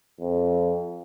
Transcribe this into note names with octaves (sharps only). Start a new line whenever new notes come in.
F2